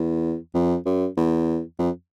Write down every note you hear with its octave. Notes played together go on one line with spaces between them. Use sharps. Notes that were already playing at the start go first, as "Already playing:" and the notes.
Already playing: E2
F2
F#2
E2
F2